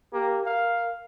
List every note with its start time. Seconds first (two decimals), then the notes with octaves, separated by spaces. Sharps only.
0.13 A#3 G4
0.46 A#4 F5